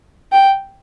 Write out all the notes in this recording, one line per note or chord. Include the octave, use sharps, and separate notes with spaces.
G5